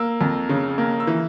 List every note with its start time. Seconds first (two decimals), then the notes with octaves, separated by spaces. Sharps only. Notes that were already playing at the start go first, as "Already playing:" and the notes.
Already playing: A#3 E6
0.21 F2
0.49 C#3
0.78 A#3
1.00 E6
1.07 E3